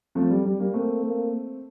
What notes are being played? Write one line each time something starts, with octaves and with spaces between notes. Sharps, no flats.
F3 A3 C4
G3
G3
G3 A#3
A3 A#3 C4
A#3